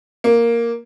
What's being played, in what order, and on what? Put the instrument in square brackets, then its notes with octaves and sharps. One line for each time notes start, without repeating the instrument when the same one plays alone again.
[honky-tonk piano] A#3